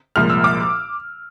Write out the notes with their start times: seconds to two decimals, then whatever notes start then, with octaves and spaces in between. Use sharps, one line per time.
0.16 C2 A#2 F3 G#3 F6
0.30 E6
0.44 D6